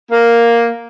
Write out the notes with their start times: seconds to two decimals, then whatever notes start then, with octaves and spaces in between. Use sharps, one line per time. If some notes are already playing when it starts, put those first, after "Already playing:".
0.11 A#3